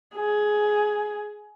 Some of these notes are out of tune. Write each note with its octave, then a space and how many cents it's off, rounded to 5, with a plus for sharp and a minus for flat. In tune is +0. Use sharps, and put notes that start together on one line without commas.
G#4 +15